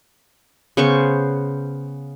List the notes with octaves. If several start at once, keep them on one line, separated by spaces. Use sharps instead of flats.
C#3 B3 C5 C#6